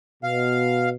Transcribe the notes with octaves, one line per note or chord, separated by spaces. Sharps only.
B2 F5